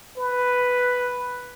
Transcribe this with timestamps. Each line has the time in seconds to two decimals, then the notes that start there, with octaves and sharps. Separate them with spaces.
0.17 B4